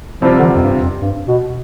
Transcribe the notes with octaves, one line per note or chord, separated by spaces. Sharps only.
C3 F3 G3 C4 F4
D3
E3
F2
G2
F2
G2
B2